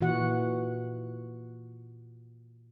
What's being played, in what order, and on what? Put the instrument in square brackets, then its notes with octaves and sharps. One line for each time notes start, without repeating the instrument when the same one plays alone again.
[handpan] A#2 E3 F#4 F#5